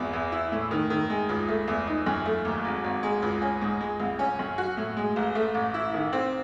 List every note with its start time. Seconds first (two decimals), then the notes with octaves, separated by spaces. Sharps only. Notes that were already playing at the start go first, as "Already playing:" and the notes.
Already playing: G#1 E2
0.13 E2
0.32 E4
0.52 A2
0.71 D#3
0.90 D#3
1.10 G#3
1.29 C#2
1.48 A3
1.67 E2
1.87 D#4
2.06 F#2
2.26 A3
2.45 D#2
2.64 G#1
2.84 G#1
3.03 G#3
3.22 C#2
3.42 C#4
3.61 G#2
3.80 G#3
4.00 C2
4.19 C#4
4.39 F#2
4.58 F#4
4.77 A2
4.97 G#3
5.16 A1
5.35 A3
5.54 A1
5.74 E4
5.94 D#3
6.13 C4